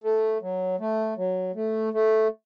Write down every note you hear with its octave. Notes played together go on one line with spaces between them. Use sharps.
A3
F#3
A3
F#3
A3
A3